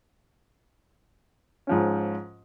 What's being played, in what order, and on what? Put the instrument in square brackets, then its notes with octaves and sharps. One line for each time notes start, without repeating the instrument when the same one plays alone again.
[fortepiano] G#2 F3 C#4